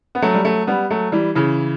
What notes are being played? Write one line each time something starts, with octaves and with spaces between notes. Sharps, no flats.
B3
F#3 A3
G3
F#3 A3
G3 B3
F#3 A3
E3 G3
C#3 E3